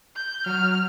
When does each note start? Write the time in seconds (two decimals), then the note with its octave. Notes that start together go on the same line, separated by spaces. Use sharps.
0.15 G6
0.46 F#3 F6